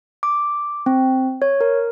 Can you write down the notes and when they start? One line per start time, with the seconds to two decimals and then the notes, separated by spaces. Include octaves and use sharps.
0.23 D6
0.86 C4
1.42 C#5
1.61 A#4